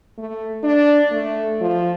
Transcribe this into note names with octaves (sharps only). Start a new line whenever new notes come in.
A3
D4
A3
F3